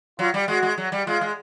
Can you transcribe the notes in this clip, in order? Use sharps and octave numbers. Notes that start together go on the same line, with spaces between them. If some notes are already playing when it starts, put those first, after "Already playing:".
F#3 F4
G3
G#3 F#4
G#3
F#3
G3
G#3 F4
G#3